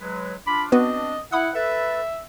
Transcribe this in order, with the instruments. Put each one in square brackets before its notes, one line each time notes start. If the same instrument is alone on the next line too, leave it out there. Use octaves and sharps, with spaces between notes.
[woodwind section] F#3 G#3 B4
[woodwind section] D4 F4 D6 [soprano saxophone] B5
[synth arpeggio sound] B3 F#4 B4 [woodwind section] C4 D4 [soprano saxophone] D#5
[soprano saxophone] E4 [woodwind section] F#5 [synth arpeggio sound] B5 D#6
[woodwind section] A4 B4 [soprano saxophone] E5